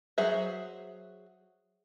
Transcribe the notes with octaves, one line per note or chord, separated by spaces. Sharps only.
F#3 G#4 C5 E5